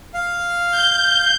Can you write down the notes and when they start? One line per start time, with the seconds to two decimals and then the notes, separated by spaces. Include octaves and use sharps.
0.14 F5
0.71 G6